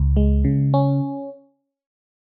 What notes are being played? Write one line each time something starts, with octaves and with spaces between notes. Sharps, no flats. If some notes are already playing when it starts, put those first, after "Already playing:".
Already playing: C#2
G#3
C#3
C#4